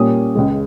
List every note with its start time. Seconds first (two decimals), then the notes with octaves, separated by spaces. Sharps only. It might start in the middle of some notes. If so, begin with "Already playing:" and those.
Already playing: A#2 G3 A#3 C#4 D#6
0.35 C#2 C#3 G#3